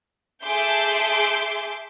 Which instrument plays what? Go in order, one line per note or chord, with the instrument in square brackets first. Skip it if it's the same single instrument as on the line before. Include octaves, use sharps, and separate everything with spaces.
[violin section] G#4 A4 E5 C6 D6 G6